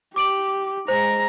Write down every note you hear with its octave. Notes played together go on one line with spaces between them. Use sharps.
G4 D6 D7 F#7
G#3 C5 A#5